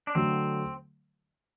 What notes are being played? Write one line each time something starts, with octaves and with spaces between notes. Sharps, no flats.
D4
D3 F#3 A3 C4